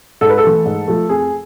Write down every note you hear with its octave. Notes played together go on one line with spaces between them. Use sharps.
G#2 A4
B4
A4
E3 A3
G#2
F3 A3
F2 G#4